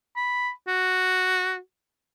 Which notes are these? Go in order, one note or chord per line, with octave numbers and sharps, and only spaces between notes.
B5
F#4